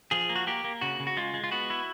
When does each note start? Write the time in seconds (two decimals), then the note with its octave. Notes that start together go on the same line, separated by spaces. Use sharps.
0.11 F3 G#4
0.30 A#3
0.36 F#4
0.47 A#3 G4
0.64 A#3
0.81 C#3 F#4
1.00 C#3
1.07 F#4
1.17 G#3 F4
1.34 G#3
1.44 F4
1.51 B3 F#4
1.70 E4